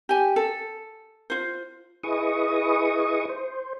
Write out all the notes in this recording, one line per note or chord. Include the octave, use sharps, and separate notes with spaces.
G4 G#5
A4
F4 C5
E4 G#4 B4 D#5 C#6 D#6
C5